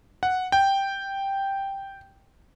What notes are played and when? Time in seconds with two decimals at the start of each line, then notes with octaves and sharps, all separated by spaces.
0.23 F#5
0.52 G5